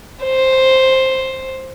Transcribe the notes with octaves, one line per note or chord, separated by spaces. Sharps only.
C5